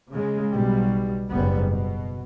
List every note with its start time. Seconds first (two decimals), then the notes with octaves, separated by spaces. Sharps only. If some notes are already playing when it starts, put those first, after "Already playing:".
0.11 C#3 G#3
0.53 B1 B2 G3
1.29 F#1 G#2 G3 B3
1.69 B2